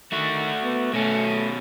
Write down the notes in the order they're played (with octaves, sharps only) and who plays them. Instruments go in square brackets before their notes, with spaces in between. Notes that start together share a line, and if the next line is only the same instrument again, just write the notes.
[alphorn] D#3 [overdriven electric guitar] A3 F#4
[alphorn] B3
[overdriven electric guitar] B2 C#4 [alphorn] A3